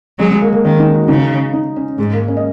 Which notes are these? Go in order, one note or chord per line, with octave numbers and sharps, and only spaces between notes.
F#3 G#3
G#3
A#3
A#3
D#3 C#4
D#4
F#4
C#3 D#4
D#4
C#4
G#2 G#3
A#3
C#4
D#5